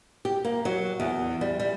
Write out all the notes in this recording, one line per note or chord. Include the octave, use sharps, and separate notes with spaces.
G4
A#3
F#3
E2
G3
G3